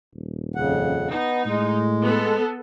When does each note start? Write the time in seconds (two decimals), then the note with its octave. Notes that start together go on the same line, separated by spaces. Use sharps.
0.15 D#1
0.56 F2 C#3 F#5
1.10 B3 D#4
1.46 A2 G#3
2.03 B3 A4